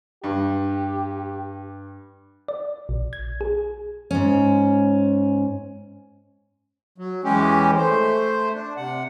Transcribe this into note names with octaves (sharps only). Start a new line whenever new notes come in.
G2 G4
D5
A#1
G#6
G#4
G#2 C#4
F#3
E2 E3 G#3 C#4 G4
A3 C5
D4
C3 F#5